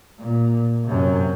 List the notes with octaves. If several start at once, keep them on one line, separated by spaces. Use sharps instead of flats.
A#2
F#2 C3